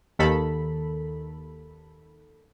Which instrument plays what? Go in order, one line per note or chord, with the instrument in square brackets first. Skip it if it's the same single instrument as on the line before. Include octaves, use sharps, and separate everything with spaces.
[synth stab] D#2 D#3 A4 B5